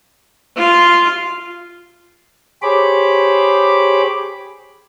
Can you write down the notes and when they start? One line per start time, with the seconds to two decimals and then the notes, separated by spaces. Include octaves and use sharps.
0.56 F4 F5
2.62 G4 G#4 C5 C#5 B5 D6